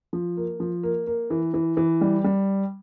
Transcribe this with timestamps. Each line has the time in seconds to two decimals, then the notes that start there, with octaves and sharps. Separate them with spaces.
0.13 F3
0.37 A#3
0.60 F3
0.83 A#3
1.07 A#3
1.30 E3
1.54 E3
1.77 E3
2.01 G3
2.24 G3